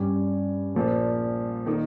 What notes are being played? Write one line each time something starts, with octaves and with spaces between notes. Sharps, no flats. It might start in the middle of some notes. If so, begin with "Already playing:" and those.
Already playing: G2 G3 C#4 G4
A#1 A#2 F3
D#3 A#3 D#4